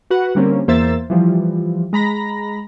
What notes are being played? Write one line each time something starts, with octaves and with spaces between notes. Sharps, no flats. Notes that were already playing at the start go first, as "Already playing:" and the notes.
F#4 B4 F#5
D3 G3 A#3 C4 C#4
E2 A#3 C5 E5 E6 A6
E3 F3 G3
G#3 A#5 B5 A#6